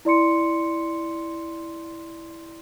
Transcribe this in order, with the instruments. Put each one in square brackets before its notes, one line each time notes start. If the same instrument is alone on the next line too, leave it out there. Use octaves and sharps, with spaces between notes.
[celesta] E4 D5 C6 C#7